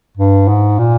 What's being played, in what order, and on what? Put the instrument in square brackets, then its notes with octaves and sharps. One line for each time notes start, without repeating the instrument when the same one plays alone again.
[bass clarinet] G2
G#2
A#2